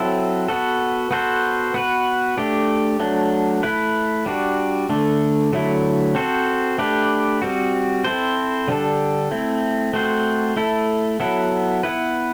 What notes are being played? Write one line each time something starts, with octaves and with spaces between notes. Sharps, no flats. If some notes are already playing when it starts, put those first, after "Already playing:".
Already playing: F#3 C4 E4 A4
B3 F#4 A4
B3 F#4 A4 C5
B3 F#4 B4
A3 D4 G4
F#3 A3 D4
A3 E4 B4
G3 D4 F#4
D3 A3 D4
D3 F#3 A3 E4
C4 F#4 A4 C5
A3 D4 G4 B4
G3 C4 F#4
C4 E4 A4 C5
D3 G3 D4 A4
A3 C4 E4
A3 C4 F#4 C5
A3 E4 A4
F#3 B3 E4 A4
B3 E4 B4